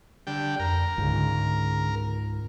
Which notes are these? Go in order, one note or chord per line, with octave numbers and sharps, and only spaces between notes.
D3 G3 G5
F2 A#4
C#2 G#2 D3